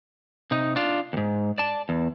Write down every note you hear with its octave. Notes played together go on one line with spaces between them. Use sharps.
C3 D#4
D4 F4
D#2 G#2
D5 A5
E2